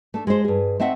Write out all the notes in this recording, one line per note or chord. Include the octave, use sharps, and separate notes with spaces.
A3 D4
G#3 C5
G2 G#4
A3 C4 D#5 E5 F#5